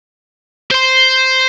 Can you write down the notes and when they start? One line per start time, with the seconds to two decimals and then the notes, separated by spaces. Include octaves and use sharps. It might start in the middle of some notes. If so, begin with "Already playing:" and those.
0.71 C5 C6